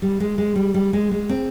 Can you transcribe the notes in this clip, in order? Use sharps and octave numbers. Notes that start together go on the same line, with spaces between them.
G3
G#3
G#3
G3
G3
G#3
G#3
C4